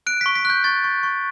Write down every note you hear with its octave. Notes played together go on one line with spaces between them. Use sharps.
F#6 D7
C#6 B6
B6
F#6 G6
C#6 A6
C#6
C#6